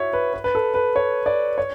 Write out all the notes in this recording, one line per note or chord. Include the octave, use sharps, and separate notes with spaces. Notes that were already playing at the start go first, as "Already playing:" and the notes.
Already playing: E4 F#4 C#5 E5
B4
B4
B4
A4
B4
C#5
D5
C#5